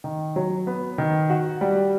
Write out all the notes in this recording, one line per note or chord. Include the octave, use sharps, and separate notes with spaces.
D#3
F#3
B3
D#3
F#4
G3